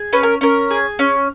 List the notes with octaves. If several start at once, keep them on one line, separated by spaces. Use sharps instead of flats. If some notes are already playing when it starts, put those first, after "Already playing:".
Already playing: G#4
C#4 B4
A#4
C#4 A#4
G#4
C#4